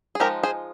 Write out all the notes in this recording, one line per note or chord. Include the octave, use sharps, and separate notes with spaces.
G#4
F3 G#3 D#4 G4 A#4
G#4 C5